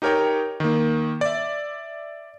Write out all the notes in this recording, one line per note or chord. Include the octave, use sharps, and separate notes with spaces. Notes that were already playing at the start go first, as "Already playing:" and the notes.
D#4 G4 A#4 C#5 G5
D#3 A#3
D5 E5